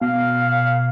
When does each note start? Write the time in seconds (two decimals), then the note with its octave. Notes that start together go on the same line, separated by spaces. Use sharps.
0.01 B2 F5